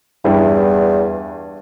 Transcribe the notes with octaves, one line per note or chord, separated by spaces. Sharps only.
E2 G2 E4